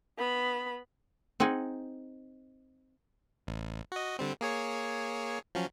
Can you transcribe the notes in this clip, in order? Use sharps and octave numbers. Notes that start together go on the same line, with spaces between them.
B3 B5
C4 D#4 G#4 F#5 G#5
A1
F#4 D#5
D3 G3 C4
A#3 G#4 C#5
F3 F#3 C#4